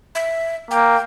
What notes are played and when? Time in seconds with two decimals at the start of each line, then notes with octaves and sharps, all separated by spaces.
0.15 E5
0.71 A#3 G5